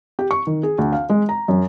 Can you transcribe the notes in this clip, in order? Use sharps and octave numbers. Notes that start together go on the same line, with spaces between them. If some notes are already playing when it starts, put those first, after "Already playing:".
G4
C#6
D#3
G#4
D2
F5
G#3
A#5
F#2